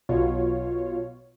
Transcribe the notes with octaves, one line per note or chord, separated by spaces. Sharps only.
B1 B2 F4 C#5